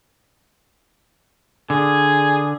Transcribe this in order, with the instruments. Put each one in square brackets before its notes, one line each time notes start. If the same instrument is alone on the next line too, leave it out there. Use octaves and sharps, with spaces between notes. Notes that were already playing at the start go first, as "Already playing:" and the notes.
[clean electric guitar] D3 [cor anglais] G#4